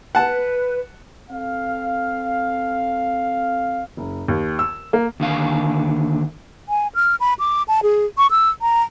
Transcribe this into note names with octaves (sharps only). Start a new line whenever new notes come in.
B4 F#5 A5
C4 A4 F5
F#1
D#2
E6
A#3
D#2 D3 F5
G#5
F6
B5
D6
A5
G#4
C#6
E6
A#5